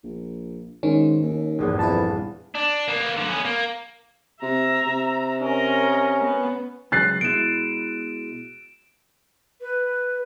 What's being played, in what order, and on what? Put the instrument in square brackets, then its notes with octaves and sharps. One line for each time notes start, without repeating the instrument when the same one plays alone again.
[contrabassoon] A#1
[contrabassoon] G#2 [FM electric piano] D#3 C#4
[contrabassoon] D#2
[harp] A#1 E2 G2
[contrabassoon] F2 [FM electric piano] E4 B4 A5
[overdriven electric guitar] D4
A#3 B3
D3 F#3
B3 C#4
A#3
[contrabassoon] C3 [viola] E5 A#5
[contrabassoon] C3
[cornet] C#4 [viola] A#4 D#5
[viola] B3
[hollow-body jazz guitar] C#3 F#3 G#3 [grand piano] F#6 A6 C7
[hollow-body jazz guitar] B2 G#3 E4 [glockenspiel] D7 E7
[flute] B4